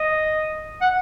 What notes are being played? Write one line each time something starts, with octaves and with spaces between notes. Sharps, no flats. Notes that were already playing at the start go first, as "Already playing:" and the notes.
Already playing: D#5
F#5